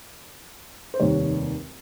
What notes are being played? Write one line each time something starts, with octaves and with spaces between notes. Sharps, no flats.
C5
F1 D#2 D#3 G3 C#5